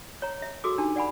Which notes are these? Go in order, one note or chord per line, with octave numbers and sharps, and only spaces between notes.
C#5 A#5
E5
F#4 G#4 A4 D6 E6
D4 D#4 G4 A5
D5 F#5 G#5 B5